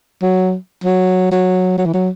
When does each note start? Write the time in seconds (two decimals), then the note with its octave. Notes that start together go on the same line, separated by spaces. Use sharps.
0.22 F#3
0.84 F#3
1.31 F#3
1.78 F#3
1.86 E3
1.94 F#3